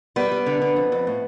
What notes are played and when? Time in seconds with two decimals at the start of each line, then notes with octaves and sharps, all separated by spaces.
0.16 G3 B3 B4
0.31 G3
0.46 D3
0.62 D3
0.76 F2
0.92 F2
1.07 A2